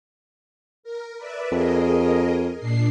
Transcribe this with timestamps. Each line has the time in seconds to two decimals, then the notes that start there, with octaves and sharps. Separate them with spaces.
0.83 A#4
1.17 B4 D5 E5
1.52 F2 G#4 A#4 D#5
2.59 A#2 D4 C7